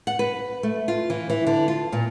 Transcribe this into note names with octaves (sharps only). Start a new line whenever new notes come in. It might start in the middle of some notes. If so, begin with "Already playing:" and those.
F#5
B4
A3
F4
E3
E3
D3
F4
A#2